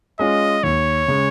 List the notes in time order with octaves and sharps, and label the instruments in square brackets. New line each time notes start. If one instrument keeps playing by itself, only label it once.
[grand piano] G#3 C#4 F4 [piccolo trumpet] D#5
[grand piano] D#2 [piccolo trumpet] C#5
[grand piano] C#3 G#3